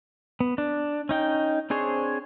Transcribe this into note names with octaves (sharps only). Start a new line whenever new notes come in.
B3
D4
C#4 D#4 G5
C4 D4 G#4 C5 C#5